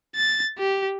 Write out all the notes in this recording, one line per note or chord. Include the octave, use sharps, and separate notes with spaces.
A6
G4